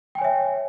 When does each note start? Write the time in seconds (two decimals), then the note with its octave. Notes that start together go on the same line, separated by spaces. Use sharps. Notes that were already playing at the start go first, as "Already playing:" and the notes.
0.15 G5
0.18 G#5
0.21 C#5
0.24 E5